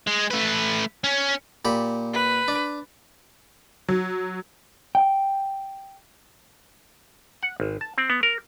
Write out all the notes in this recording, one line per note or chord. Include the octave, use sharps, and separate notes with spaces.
G#3
A3 B4
C#4
A#2 G4 B5
B4
D4
F#3
G5
F#5
G#1
A5
C4
B3
A#4